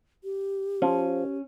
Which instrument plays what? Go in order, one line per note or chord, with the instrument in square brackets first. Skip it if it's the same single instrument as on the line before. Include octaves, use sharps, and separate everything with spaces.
[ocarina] G4
[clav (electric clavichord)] F3 [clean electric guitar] C#4